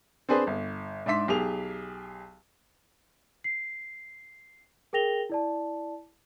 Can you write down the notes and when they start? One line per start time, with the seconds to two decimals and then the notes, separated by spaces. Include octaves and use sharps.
0.29 C4 D4 G#4 B4 C5
0.47 G1
1.06 G#2 D4 D5 E5 C6 B6
1.28 B1 G4 G#4 F7
3.44 C7
4.93 G#4 A#4 G5 A#6 F7 G7
5.29 E4 D5 A5